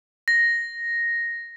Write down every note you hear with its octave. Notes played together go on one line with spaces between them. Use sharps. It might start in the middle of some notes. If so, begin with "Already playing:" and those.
A#6